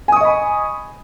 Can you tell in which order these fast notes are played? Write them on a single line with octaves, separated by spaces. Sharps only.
G#5 D#6 C#6 D#5 B5